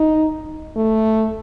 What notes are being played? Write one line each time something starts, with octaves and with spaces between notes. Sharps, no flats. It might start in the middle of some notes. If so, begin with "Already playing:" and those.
Already playing: D#4
A3